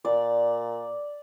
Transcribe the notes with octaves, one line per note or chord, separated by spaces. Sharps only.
A#2 D5